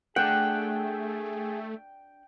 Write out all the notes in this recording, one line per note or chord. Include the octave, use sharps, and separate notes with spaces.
A3 D4 G#4 F#5 G5